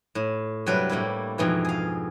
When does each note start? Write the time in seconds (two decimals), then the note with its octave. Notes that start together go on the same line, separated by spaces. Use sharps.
0.15 A2
0.66 G2 C3 F#3 D4 B4 D5
0.89 A2 G3 A#3 E4
1.38 F2 G#2 B2 E3
1.65 G#4 F5